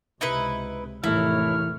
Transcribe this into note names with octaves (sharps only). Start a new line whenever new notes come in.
C#2 C3 D#4 E4 B4
F1 D#2 A2 E3 A3 E4 C#5 F6